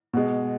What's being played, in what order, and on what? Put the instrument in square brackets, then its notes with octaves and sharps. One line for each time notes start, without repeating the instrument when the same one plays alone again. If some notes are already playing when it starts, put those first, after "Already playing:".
[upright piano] B2 G#3